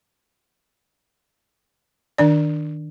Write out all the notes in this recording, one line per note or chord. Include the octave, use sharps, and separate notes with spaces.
D#3 D4 D5